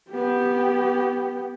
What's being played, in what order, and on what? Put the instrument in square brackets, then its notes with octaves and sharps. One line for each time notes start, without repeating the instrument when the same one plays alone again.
[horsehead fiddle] B3 G4